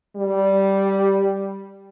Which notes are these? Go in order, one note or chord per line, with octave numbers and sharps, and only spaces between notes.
G3